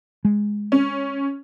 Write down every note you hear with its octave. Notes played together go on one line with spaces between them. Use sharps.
G#3
C#4